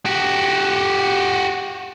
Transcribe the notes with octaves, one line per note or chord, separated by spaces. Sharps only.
F#4 G4